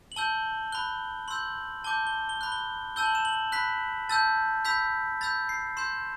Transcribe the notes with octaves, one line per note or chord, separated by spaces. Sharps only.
F#7
A5 E6 G6 G7
B5 F#6 G7
C6 E6 G6 F#7
A5 D6 G6 G7
G7
G7
B5 F#6
G7
A5 E6 G6 G7
F#7
E7
F#7
B5 F#6 B6
A5 E6 G6 A6
B5 E6 G6 B6
B5 E6 G6 A6
C7
C6 G6 E7